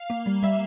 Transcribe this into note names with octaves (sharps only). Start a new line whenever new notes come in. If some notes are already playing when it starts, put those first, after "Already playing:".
Already playing: F5
A#3
G3
G3 E5